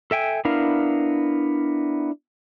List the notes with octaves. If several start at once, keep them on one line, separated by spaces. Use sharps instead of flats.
A4 E5 G5 G#5
B3 D4 E4 A#4 F5